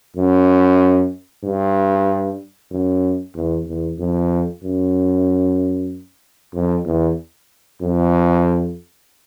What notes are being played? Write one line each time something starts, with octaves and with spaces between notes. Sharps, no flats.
F#2
G2
F#2
E2
E2
F2
F#2
F2
E2
F2